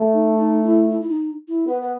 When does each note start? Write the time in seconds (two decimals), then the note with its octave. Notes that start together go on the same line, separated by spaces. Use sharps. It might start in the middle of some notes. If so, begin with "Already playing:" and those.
Already playing: A3
0.13 D#4
0.38 D#4
0.64 E4
0.90 E4
1.01 E4
1.09 D#4
1.48 E4
1.67 B3 B4
1.82 B4